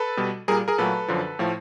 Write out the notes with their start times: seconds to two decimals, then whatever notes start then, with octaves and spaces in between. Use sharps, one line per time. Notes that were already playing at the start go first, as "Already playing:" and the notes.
Already playing: A4 B4
0.17 B2 G3
0.48 A#2 G3 G#4 A#4
0.68 G#4 A#4
0.78 A#2 F#3 A3 A4 B4
1.08 F#2 D3 F3
1.39 A2 F3 A3